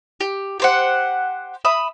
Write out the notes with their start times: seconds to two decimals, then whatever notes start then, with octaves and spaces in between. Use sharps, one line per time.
0.21 G4
0.60 G4 C5 F#5
1.65 E5 B5 D#6